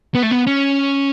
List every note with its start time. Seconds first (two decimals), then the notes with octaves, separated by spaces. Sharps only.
0.14 B3
0.23 A3
0.31 B3
0.47 C#4